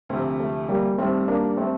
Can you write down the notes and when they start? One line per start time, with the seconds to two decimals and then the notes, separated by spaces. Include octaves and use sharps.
0.09 D2 C3 F3 A3 C4
0.40 A3
0.69 G3 A#3
0.98 G2 D#3 G3 A3 C4
1.28 A#3 D4
1.57 A3 C4